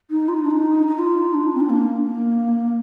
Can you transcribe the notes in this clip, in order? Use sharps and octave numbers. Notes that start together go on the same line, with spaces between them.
D#4
F4
D#4
D4
D#4
D#4
F4
D4
D#4
C4
D4
A#3
A#3